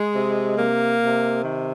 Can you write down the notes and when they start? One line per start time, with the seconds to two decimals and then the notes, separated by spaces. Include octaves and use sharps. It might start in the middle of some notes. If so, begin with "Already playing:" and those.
Already playing: G#3
0.13 C3
0.57 C3 A#3
0.99 C3
1.43 D#3